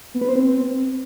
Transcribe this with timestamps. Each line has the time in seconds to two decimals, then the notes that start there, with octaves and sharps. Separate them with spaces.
0.14 B3
0.21 B4
0.28 C5
0.36 C4